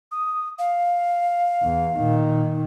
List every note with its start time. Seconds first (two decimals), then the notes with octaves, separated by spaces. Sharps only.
0.12 D#6
0.59 F5
1.62 E2
1.97 A#2 D#3